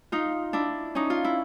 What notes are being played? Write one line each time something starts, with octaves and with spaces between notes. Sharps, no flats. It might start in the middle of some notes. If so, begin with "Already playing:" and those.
D#4 F4
D4 E4
C#4 D#4
F4
E4